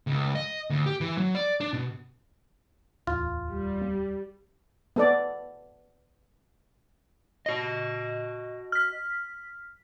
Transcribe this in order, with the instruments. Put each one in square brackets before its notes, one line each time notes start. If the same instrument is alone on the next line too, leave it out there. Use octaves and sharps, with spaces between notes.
[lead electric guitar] C#2
D#5
D2
G4
E3
F#3
D5
D4
B2
[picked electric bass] D1 E2 [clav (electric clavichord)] F4
[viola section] G3
[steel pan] B3 A4 D5
[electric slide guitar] F#4 D#5
[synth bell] F6 B6